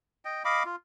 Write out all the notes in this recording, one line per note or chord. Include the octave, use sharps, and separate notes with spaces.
D#5 G5
D#5 F5 B5 D6
F4